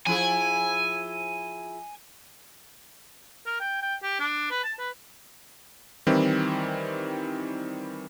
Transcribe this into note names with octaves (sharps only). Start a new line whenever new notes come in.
F3 E4 G#4 G#5
A#4
G5
G5
G4
D4
B4
A5
B4
D#3 E3 G3 C4 E4